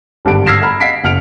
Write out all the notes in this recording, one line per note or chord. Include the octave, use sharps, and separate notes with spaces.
G#1 G2 D3 F#5 D7
E6 F6 G#6 A#6 C7 E7
F#5 A#5 B5 F6
D#5 F5 F#5 B6 C7 D7
F#1 F#5 F6 D7 F7